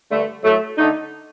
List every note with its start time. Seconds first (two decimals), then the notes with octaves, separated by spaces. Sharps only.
0.11 G2 D3 A3
0.43 A2 F#3 A3
0.77 D3 A3 D#4